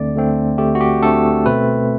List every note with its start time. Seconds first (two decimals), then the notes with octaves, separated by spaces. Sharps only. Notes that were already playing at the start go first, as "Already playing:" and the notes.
Already playing: D2 D3 A3 C4 D5
0.14 D2 D3 A3 C4
0.58 D2 D3 A3 C4 G4
0.75 F#4
0.81 G4
1.02 D2 D3 A3 C4 A4
1.46 B2 A3 C4 B4